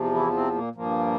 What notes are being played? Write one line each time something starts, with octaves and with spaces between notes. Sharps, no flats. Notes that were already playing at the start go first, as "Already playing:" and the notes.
Already playing: E2 C3 F3
E3 E4
C3 C4
A#2 A#3
G2 A#2 F3 A#3